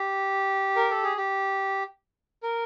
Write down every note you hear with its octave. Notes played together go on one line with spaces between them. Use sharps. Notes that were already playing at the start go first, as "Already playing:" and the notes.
Already playing: G4
A#4
A4
G#4
G4
A#4